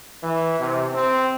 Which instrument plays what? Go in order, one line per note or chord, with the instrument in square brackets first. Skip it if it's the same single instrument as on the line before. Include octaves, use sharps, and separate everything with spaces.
[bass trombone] E3
C3
C4